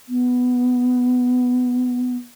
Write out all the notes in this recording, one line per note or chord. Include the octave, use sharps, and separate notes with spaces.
B3